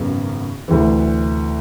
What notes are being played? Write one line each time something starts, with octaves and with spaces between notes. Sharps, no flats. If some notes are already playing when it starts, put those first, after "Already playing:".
Already playing: G#1 F#2 C#3 F#3 B3
D2 C3 E3